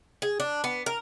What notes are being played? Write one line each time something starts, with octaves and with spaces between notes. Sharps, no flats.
G#4
D4
B3
A#4